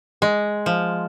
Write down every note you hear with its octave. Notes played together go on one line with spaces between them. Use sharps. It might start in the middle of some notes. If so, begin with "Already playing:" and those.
G#3
F3